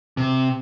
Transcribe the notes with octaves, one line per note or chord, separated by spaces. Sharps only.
C3